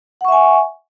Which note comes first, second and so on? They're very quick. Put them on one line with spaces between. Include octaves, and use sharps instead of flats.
F#5 C#6 E5 G#5